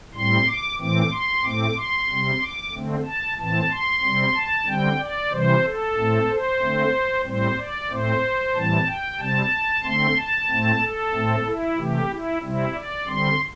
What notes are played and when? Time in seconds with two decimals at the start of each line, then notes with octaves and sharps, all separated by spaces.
0.15 A2 G3 C4 C6
0.47 D6
0.79 A2 E3 A3 C4 D6
1.11 C6
1.43 A2 A3 C4 D6
1.76 C6
2.09 C3 G3 C4
2.41 D6
2.73 D3 A3 C4
3.05 A5
3.38 A2 E3 C4 A5
3.70 C6
4.02 C3 G3 C4
4.35 A5
4.66 D3 G3 C4 G5
4.99 D5
5.31 C3 E3 G3 C5
5.64 A4
5.96 A2 A3 C4
6.29 C5
6.60 D3 A3 C4
7.25 A2 G3 C4 C5
7.58 D5
7.90 A2 A3 C4 C5
8.54 A2 E3 G3 C4 A5
8.87 G5
9.19 C3 G3 C4 A5
9.84 D3 A3 C4 C6
10.17 A5
10.49 A2 A3 C4
10.80 A4
11.13 A2 A3 C4
11.45 E4
11.77 C3 E3 A3 G4
12.10 E4
12.42 C3 G3 C4 E4
12.74 D5
13.07 D3 G3 C4 C6